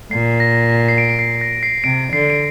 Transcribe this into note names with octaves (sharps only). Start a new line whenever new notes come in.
A#2 C7
A#6
C7
D7
D7
C7
A#6
C7
C3 D7
D3 C7
D7